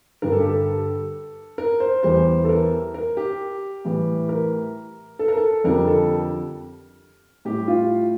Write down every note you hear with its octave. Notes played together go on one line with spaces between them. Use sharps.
G2 D3 G3 A#4
A4
G4
A4
A#4
C5
E2 E3 G3 C5
A4
A#4
A#4
G4
A2 E3 G3
A#4
A4
A#4
A4
F2 D3 G3 A#4
A4
A2 G3 G4
F4